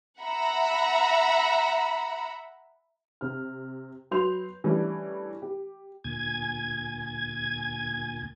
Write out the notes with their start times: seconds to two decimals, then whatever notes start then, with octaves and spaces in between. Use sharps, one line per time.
0.20 E5 F#5 A#5 B5
3.21 C3 F6
4.11 F#3 B4 C6 G6 F7
4.64 E3 G3 A3 C#4 D4
5.42 G4
6.04 D2 A#2 G#5 G#6